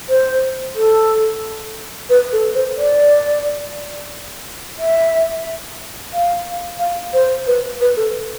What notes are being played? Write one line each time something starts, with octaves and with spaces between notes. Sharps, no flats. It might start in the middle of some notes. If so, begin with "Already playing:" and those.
C5
A4
B4
A4
C5
D5
E5
F5
F5
C5
B4
B4
A4